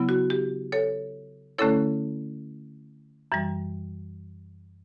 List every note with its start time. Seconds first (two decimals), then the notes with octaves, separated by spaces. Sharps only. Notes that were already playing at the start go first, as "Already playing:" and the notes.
Already playing: C#3 F#3 B3 E4
0.09 F#4
0.30 G4
0.72 A4 C#5
1.58 D3 A3 C#4 E4 A4 C#5
3.32 F#2 E3 G3